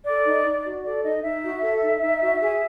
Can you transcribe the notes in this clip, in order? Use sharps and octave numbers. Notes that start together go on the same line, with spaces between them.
A4 D5
D#4
D#4
F#4
A4 D5
D#4 D#5
D#4 E5
F#4
A4
D#4
D#4
F#4
G#4